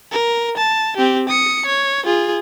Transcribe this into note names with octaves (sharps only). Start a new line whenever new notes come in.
A#4
A5
C4 G4
D#6 C#7
C#5
F4 G#4